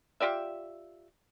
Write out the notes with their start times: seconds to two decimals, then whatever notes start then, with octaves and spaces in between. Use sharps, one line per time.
0.20 F4 G4 D5 E5